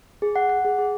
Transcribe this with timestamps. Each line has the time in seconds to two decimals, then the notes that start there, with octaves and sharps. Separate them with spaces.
0.22 G#4
0.36 F#5
0.49 F#5
0.65 G#4
0.78 G#4